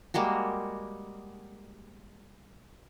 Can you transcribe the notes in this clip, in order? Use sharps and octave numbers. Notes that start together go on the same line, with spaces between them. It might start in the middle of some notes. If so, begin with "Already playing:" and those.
G3 G#3 A#3 F#4